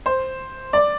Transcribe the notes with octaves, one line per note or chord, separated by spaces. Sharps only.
C5
D5